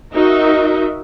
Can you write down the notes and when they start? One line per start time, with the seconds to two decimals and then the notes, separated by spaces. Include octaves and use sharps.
0.13 D#4 F#4 A#4 D#5 E5